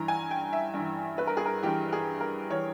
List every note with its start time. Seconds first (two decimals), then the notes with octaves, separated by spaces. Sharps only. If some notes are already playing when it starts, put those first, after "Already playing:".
Already playing: G2 E3 A#5
0.08 G#5
0.31 G5
0.53 E5
0.74 G2
0.79 E3
1.18 B4
1.27 A#4
1.37 G#4
1.46 A#4
1.63 G2 E3 G4
1.92 G#4
2.21 A#4
2.51 E3 C#5